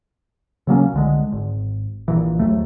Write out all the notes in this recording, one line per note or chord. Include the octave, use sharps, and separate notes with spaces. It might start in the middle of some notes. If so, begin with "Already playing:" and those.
C#3 F#3 A#3 C#4
C2 D3 G#3
G#1
A#1 A#2 E3
A#1 D#2 F#3 A3